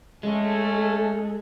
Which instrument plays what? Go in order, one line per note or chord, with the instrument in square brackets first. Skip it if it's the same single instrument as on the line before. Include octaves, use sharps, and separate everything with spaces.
[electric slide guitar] G#3 [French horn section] A3 C#4 [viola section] A4